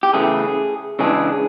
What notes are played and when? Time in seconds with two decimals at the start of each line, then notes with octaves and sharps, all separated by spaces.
0.03 G4
0.13 C#3 E3 A3 G#4
0.99 C#3 E3 G#3 B3 D4 G#4